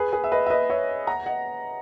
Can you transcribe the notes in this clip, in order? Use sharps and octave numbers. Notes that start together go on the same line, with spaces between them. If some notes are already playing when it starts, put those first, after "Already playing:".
Already playing: G#4 B4
G#4 B4
E5
B4 D#5
E5
B4 D#5
C#5 E5
F#5 A#5
D#5 F#5